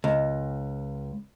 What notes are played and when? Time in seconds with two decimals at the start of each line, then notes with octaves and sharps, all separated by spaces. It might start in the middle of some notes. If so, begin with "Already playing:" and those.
0.04 C#2